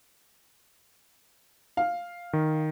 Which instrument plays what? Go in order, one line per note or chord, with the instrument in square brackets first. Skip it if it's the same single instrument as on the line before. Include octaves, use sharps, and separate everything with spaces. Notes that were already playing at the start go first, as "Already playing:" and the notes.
[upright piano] F5
[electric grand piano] D#3